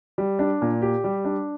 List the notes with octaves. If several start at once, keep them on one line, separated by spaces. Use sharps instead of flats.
G3
D4
A#2
G4
G3
D4